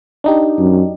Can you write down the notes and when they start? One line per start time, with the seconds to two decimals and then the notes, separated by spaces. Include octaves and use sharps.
0.24 D4 D#4 G4
0.58 F#2